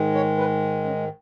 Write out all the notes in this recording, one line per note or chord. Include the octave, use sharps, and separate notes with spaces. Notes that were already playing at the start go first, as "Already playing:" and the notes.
Already playing: G#2 D#3 G#3
C#5
B4
C#4